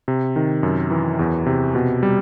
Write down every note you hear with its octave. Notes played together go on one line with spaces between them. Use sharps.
C3
D#3
F#2
E3
E2
C3
B2
G3